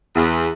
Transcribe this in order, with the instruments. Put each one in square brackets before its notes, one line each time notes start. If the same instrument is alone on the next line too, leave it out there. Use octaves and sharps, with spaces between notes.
[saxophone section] E2